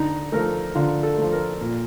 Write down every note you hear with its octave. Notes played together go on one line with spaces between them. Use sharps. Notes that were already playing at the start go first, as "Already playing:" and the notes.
Already playing: D3 D#4
F3 A3 A#4
D3 F4
A4
F3 A3
A#4
A#2